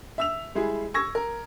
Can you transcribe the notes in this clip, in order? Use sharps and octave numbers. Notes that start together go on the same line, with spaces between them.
E5 E6 F7
G3 G#3 E4 G#4
C#6 E6 G#6 A#6
A#4